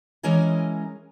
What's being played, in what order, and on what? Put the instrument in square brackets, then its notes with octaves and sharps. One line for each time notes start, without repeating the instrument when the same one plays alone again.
[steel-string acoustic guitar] E3 G#3 C#4 A#4 D#5 G#5